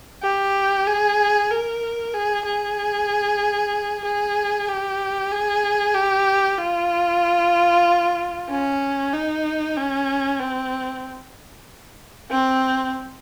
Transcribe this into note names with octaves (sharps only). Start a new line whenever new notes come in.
G4
G#4
A#4
G#4
G#4
G#4
G4
G#4
G4
F4
C#4
D#4
C#4
C4
C4